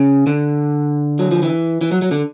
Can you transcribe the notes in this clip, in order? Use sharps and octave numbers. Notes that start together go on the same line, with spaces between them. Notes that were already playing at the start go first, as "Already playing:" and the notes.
Already playing: C#3
D3
F#3
F3
E3
E3
F#3
F#3
D3